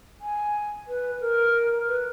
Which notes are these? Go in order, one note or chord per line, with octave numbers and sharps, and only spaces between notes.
G#5
B4
A#4
B4